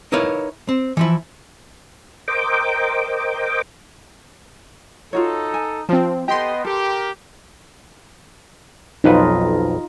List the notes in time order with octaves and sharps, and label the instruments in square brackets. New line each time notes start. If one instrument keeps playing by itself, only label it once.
[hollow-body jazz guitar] D#4 E4 A#4 B4 C#5 F5
C4
E3 F3 E4
[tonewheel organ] A#4 C5 D#5 G5 D6
[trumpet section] D#4 A4 [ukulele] F4 F#4 C#5
[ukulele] G#5
[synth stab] F3 C4 [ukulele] F4 A5
[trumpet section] B3 D#5 [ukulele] G4 A4 [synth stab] G5 C6
[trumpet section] G4 A#4 [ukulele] A4
[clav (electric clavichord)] B1 F2 B4 [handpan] D#4 F4